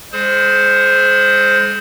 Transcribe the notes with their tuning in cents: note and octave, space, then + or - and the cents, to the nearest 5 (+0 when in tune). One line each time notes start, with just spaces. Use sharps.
G#3 -35 G#4 +40 C5 +0